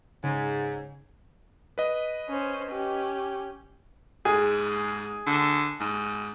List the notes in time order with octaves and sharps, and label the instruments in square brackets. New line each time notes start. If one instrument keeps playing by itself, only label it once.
[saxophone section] G#2 [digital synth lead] C#3
[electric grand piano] B4 D#5
[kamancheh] C#4 C5
C#4 G4
[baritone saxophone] G#2 [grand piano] G#4
[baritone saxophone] D3
G#2